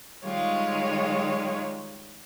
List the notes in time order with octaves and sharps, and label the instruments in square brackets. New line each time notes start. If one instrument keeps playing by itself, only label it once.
[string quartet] D#3 G3 G#3 F4 C#5